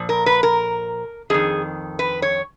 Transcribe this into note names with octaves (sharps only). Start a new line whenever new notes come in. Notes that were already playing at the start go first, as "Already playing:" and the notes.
Already playing: A#2 F3
A#4
B4
A#4
F2 D#3 G#4
B4
C#5